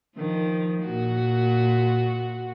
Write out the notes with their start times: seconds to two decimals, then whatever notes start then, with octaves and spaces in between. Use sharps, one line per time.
0.17 D#3 F3
0.84 A#2 F#4